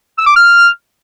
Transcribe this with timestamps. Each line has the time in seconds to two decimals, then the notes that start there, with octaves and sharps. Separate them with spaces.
0.18 E6
0.27 D6
0.36 F6